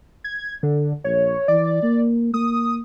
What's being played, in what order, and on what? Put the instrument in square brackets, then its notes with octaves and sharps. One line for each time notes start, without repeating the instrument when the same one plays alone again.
[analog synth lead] G#6
D3
[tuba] A#1 [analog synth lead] C#5
[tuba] E3 [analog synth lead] D5
[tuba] A#3
[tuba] A#3 [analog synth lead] D#6